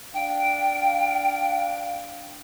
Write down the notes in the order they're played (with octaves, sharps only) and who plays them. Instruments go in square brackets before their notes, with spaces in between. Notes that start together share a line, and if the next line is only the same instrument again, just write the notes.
[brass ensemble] D4 F5 [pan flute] G5